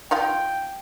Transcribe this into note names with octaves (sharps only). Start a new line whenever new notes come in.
D#4 F4 F5 G5